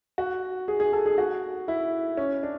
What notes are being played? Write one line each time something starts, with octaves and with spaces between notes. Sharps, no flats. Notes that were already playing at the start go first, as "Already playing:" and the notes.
F#4
G#4
G#4
A4
G#4
F#4
E4
C#4
D4